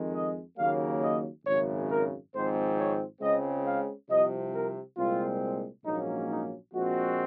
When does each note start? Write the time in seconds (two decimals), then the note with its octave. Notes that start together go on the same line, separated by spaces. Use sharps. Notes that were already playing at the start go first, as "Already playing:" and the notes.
Already playing: F2 D#3 G#3
0.14 D#5
0.58 D#2 C#3 F#3 A#3 F5
1.02 D#5
1.45 G#1 F#2 C#3 C#5
1.90 A#4
2.33 G#1 G#2 F3 C4 C5
2.78 C#5
3.21 C#2 C#3 G#3 C4 D#5
3.66 F5
4.09 C2 C3 F3 D#5
4.54 A#4
4.97 C2 A#2 G#3 C4 F4
5.85 A#1 G#2 F#3 A#3 C#4 D#4
6.28 D#4
6.73 A#1 A#2 F3 G#3 C4 F#4